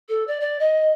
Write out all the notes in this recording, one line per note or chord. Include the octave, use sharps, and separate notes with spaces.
A4
D5
D5
D#5